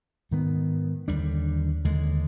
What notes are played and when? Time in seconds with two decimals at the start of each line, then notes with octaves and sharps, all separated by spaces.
0.31 G#2 D#3 B3
1.08 D#2 D3 G3 D4
1.84 D#2 D3 G#3